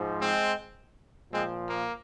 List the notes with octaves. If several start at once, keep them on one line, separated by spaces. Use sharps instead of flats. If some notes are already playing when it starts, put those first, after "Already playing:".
Already playing: G#2 F3
G#3 C4
A#2 F3 G#3 C4
A#3